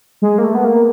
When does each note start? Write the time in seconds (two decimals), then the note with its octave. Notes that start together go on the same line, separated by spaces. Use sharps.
0.22 G#3
0.38 A#3
0.44 A3
0.55 B3
0.65 A#3